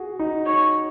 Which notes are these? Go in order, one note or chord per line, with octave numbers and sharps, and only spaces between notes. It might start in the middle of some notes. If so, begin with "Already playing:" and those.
Already playing: F#4 G#4
D#4
C#5